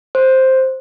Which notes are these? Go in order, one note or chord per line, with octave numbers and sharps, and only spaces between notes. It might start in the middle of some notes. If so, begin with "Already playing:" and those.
C5